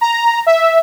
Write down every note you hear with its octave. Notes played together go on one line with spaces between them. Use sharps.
A#5
E5